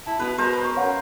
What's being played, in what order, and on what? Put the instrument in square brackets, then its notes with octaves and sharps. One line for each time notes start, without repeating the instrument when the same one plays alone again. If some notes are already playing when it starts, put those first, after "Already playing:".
[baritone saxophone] E4 [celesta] A5
[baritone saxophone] B2 [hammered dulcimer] B4
[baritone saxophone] B2 [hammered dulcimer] A#4 C5
[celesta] C#6
[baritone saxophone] F#2 [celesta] C#5 F5 F#5